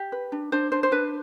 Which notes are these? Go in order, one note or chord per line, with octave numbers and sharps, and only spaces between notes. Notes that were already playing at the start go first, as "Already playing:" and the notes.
Already playing: G4
B4
D4
D4 C5
D4 C5
C5
D4 B4